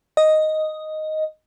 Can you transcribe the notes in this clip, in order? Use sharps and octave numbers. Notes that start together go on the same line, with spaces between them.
D#5